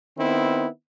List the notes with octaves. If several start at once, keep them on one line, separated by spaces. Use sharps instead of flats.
D#3 B3 C4 E4